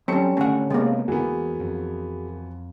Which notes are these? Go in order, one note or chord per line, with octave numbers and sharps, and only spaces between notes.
F#3 G3 C4 C#4 A4 C#5 C#7
G#1 D3 A3 C#4 F#5
C3 G#3 A#3 B3
E2 E3 B3 F#4 G#4 A#4
F2